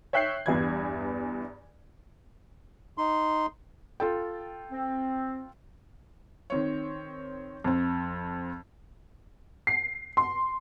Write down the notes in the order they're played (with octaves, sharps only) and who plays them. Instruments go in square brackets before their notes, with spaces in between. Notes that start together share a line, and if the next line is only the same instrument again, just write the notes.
[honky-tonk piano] C#5 E5 G5 F#6 G6 C7
E2 G2 E3 G#6
[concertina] D#4 C6
[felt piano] F4 A4 G5
[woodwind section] C4
[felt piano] D#3 C4 C#5
F2 C4
[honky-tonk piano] C7
C6